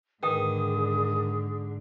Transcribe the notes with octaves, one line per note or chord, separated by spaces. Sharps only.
G#2 D3 D#3 G#4 B4 G5 D#6